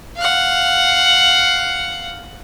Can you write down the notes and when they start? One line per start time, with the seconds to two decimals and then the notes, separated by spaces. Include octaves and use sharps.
0.17 F5 F#5